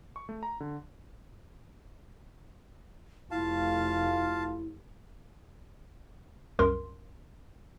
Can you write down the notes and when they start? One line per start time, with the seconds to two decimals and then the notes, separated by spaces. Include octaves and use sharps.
0.16 C#6
0.29 A3
0.43 A#5
0.60 D3
3.31 F1 A3 E4 F4 F5 A5
6.59 C2 F#2 A#4 C6